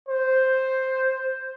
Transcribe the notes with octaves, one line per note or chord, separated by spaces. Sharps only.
C5